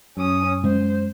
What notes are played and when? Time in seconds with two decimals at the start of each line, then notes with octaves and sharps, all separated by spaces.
0.17 F#2 C#4 D#6
0.64 G#3 C#4 C5